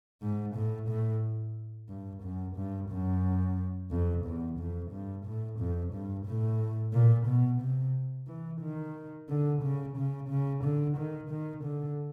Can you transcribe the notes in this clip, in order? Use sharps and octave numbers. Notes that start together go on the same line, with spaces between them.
G#2
A2
A2
G2
F#2
G2
F#2
F2
E2
F2
G2
A2
F2
G2
A2
A#2
B2
C3
E3
D#3
D3
C#3
C#3
C#3
D3
D#3
D#3
D3